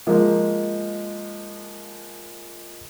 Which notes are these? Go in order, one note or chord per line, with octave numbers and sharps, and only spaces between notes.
F3 G#3 A#3